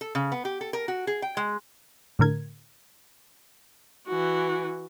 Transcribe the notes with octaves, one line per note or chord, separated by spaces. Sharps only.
A4
C#3
B3
G4
A4
A#4
F#4
G#4
G5
G#3
A2 D3 A#4 G#6
E3 F#4